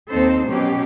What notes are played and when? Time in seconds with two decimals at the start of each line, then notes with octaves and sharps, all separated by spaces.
0.12 D#2 C4 D#4 A4 C5
0.49 B2 F#3 C#4 G4